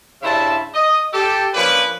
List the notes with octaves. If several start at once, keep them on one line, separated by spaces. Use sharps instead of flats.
G2 C#3 E4 C5 E5 A5
D#5
G4 A4
F3 A#3 C#4 D4 B4